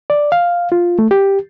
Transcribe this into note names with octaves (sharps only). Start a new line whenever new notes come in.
D5
F5
F4
A3
G4